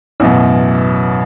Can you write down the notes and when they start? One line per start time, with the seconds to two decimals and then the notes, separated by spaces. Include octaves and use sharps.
0.20 A1 F#2 B2